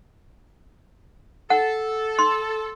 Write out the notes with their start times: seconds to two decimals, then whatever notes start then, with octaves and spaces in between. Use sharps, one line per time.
1.50 A4 F#5
2.19 C6